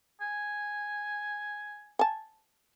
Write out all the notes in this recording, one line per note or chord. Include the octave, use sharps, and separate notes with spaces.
G#5
G#5 A5